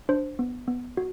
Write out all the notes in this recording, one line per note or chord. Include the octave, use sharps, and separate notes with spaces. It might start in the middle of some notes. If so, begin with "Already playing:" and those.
D4 C5
B3
B3
F#4